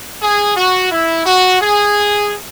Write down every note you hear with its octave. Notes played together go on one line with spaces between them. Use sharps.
G#4
F#4
E4
F#4
G#4